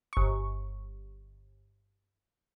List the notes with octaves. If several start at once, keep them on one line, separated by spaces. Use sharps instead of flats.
G1 C#6